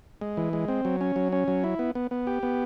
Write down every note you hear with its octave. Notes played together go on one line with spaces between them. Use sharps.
G#3
E3
G#3
C4
F#3
C#4
F#3
C#4
F#3
E4
B3
B3
B3
G4
B3